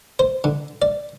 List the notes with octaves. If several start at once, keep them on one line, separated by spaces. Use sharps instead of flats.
C5
D3
D5